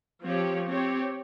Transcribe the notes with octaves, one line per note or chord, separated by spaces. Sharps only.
F3 C4 G4 C#5
C4 G4 C#5